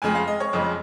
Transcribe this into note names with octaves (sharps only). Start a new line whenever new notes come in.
F2 C#3 G#3 G#5
F5
D#5
C#5
F2 C#3 G#3 D#5